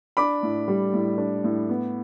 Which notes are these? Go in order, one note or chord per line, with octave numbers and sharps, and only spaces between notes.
D4 B5 D6
A2
G3
A2
D4
A2
B3